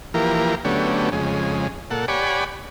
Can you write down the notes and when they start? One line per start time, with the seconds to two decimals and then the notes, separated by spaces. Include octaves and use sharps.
0.14 E3 F3 A#3 G4 A#4
0.65 D3 F#3 A3 B3 C#4 G4
1.12 F2 C#3 G#3
1.91 A#2 A4 F#5
2.08 G4 C#5 D5 F#5 G#5 B5